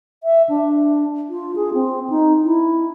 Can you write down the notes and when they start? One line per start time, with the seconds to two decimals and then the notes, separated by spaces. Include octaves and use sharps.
0.23 E5
0.49 D4
1.29 F4
1.56 G#4
1.74 C4
2.10 D#4
2.43 E4